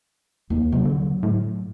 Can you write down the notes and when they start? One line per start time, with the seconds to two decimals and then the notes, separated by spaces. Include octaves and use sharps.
0.50 D#2
0.72 C3 F#3
0.85 D3
1.23 A2